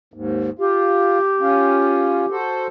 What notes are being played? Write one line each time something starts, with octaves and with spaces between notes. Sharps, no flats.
D#2 G#2
F4 G4
C#4 F4
F#4 A4 C5